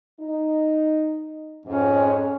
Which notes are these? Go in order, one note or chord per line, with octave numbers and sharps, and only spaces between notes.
D#4
F2 G#2 C#4